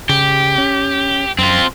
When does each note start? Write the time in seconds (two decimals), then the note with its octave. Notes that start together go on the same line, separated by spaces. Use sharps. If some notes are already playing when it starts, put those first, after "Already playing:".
0.09 C#3 G4
0.58 C#4
1.39 F#2 C4 F4